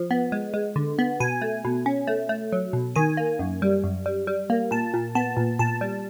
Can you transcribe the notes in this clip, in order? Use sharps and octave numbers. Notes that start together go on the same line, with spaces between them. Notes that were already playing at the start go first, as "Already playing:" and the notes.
Already playing: F3
B3
G#3
G#3
D3
B3
B2 G#5
A3
B2
C#4
A3
A3
F#3
B2
D#3 G#5
A#3
F#2
G3
F#2
G3
G3
A#3
A#2 A5
A#2
B3 A5
A#2
A#2 A5
G3